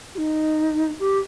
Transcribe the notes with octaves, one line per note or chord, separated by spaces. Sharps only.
G4
D#4
G4